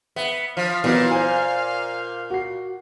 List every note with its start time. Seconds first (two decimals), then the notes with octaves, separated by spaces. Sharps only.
0.16 B3 E5
0.57 F3 F5
0.84 A#2 E3 F#3 B3
1.11 C5 G#5
2.30 F#4 C7